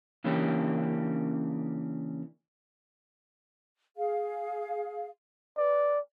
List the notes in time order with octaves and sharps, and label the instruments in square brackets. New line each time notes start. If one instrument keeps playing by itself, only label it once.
[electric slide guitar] C#3 E3 A#3 C#4 D4 G4
[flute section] G#4 F5
[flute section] B4 [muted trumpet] D5